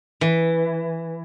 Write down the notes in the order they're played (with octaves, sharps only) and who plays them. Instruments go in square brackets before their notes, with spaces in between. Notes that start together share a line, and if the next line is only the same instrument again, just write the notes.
[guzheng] E3